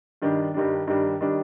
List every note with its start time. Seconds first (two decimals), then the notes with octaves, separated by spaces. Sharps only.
0.22 G2 D#3 G3 D4
0.54 G2 D#3 G3 D4
0.87 G2 D#3 G3 D4
1.21 D#3 G3 D4